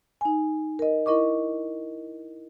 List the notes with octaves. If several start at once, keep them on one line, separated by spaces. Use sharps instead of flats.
D#4 G#5
A#4 D#5
E4 A#4 D#5 C#6 D6